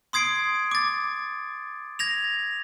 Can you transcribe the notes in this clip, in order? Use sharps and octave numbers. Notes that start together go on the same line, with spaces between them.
C6 D#6 G#6 C7 D7
D6 A6
G#6 A#6 F7